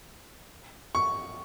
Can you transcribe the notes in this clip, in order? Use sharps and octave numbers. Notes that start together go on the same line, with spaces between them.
C#6